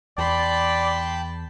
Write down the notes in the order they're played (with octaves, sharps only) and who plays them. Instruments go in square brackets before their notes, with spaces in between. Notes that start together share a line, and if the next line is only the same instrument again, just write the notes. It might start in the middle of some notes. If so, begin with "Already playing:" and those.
[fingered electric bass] E2 [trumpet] D5 [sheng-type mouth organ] G5 A5 [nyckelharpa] B5 C6